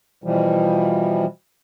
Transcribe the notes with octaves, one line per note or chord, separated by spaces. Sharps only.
B2 E3 F3 G3